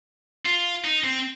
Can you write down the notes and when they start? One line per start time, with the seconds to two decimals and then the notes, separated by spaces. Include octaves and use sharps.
0.45 F4
0.84 D#4
1.04 C4